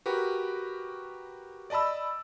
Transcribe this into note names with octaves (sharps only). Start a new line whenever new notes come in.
F#4 G4 A#4 B4
D5 D#5 A5 B5 E6